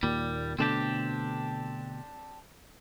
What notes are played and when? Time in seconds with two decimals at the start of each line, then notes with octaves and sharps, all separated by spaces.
0.03 D#2 A#2 G3
0.59 B2 D3 A3 C4 D4 G4